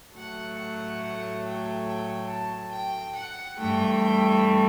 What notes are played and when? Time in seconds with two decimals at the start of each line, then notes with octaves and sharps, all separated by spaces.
0.16 A2 F#3 A3 F#5
0.58 F#5
1.01 F#5
1.44 G5
1.87 G5
2.30 A5
2.72 G5
3.15 F#5
3.58 G2 E3 A3 G5
4.01 G5